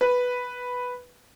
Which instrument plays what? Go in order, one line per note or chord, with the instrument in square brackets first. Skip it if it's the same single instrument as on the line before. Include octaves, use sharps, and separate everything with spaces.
[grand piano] B4